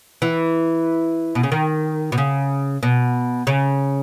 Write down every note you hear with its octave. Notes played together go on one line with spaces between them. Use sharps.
E3
B2
C#3
D#3
B2
C#3
B2
C#3